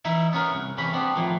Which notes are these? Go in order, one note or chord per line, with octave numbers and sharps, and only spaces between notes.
E3 D#4 E4 E5
B3 C#4 A#4
C2
E2 C3 C#4 B5
B3 C4 D4
A2 D#3 F3